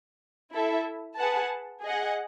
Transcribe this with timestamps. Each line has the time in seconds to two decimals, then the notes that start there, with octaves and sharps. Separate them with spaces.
0.51 E4 A4 E5
1.17 G#4 B4 F#5 A5
1.83 G#4 D#5 F#5